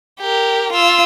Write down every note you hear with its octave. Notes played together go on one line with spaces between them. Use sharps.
G4 A#4
F4 E6